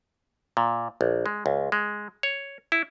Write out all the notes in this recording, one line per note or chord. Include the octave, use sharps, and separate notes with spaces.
A#2
A#1
G#3
C#2
G#3
C#5
E4